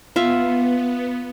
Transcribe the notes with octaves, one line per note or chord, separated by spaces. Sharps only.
B3 F4 E5